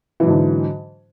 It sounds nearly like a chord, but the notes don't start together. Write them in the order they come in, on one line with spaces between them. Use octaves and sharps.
E3 F#3 G#2 D3